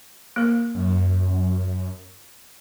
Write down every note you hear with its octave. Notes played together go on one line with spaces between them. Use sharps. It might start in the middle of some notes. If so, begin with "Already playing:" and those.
A#3 A#4
F#2